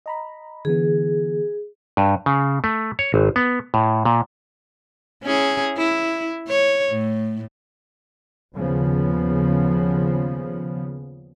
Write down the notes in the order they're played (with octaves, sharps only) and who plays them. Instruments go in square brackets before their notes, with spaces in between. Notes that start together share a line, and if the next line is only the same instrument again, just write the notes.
[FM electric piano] D#5 A#5 B5
[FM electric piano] D3 E3 B3 [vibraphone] G#4
[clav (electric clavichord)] G2
C#3
A3
C#5
G#1
B3
A2
A#2
[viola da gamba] C#4 E4 G#4
E4
C#5
A2
[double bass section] D#2 C#3 F3 B3